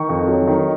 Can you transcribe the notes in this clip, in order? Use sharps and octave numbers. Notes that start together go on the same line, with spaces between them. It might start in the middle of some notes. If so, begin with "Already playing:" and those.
Already playing: D#3 C#6
F2
F#3
D#3